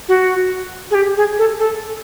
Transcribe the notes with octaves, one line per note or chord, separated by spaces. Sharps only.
F#4
G#4
G4
G#4
A4
A4